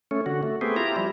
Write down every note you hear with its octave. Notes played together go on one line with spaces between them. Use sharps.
A3 C#4
D3 F#4
A3
A3 B3 C4 G4 G#4
E4 F4 G4 A#5
F3 G3 E4